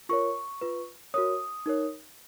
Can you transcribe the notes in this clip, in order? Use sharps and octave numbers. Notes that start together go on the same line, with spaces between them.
F4 A#4 C#5 C#6
F4 B4
F#4 A#4 C#5 D#6
D#4 A#4 C#5